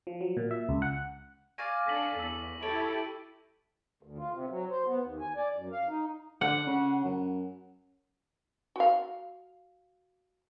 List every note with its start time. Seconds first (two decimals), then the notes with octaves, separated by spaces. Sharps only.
0.07 F3
0.21 F#3
0.37 A#2
0.51 E5
0.69 C#2
0.82 F#5
1.58 D5 F5 G#5 C#6 A#6 D#7
1.87 D4 A4 A#6 B6 F#7
2.19 E2 E6 B6
2.63 E4 G4 A4 C#5 D7
4.03 D2
4.18 F4
4.31 C3
4.50 F#3
4.70 C5
4.86 B3
5.03 D#2
5.20 G#5
5.36 D5
5.56 F#2
5.72 F5
5.89 D#4
6.41 D3 F#5
6.67 C#3
7.04 F#2
8.76 F#4 F5